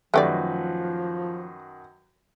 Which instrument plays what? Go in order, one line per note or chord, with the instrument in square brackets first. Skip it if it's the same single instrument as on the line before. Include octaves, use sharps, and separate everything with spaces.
[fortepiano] F#2 D#3 B4 [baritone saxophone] F3 [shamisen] A3 G4 D5